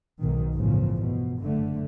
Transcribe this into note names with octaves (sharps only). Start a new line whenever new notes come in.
B1 G#2 B2 D#3
G1 E2 A2 C#3 F3
B2
F#1 D3 A3